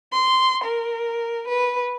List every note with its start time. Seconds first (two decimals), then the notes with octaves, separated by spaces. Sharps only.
0.12 C6
0.64 A#4
1.48 B4